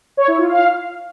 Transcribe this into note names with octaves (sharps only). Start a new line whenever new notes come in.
C#5
E4
F4
F5